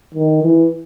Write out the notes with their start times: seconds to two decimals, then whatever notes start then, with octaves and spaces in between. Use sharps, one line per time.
0.14 D#3
0.42 E3